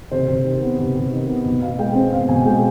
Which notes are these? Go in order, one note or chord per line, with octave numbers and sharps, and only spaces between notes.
C3 C5
C3
D#3
B3
C3
C3
D#3
B3
B2
B2 F5
G#3 G5
C4
B2 F5
B2 G#5
G#3 G5